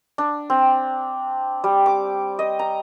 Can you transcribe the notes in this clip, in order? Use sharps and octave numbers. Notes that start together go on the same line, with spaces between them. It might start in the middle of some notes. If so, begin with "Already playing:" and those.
D4
C4
G3
D6
D#5
A#5